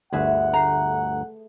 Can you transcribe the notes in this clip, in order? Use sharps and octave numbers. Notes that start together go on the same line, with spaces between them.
G1 D2 G#4 B4 E5 F#5
A3 A#5 C7